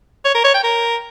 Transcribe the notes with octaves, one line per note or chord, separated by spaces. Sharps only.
C#5
A#4
C#5
G5
A#4